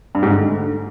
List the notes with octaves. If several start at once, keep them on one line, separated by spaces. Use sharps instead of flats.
G2
G#2
D3
A3